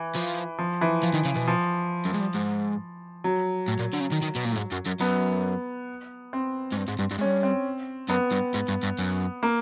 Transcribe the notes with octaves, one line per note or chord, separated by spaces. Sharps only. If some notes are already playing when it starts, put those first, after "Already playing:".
Already playing: E3
F3
F3
E3
F3
D#3
C#3
B2
F3
F#2
G#2
G2
G#2
F#3
A2
A#2
D3
C#3
D#3
D#3
B2
A#2
A2
G#2
F#2
F#2
F#2 B3
C4
G#2
G2
G#2
G2
G2
G#2
G2 C#4
C4
F#2 B3
G2
G#2
G2
G2
F#2
A#3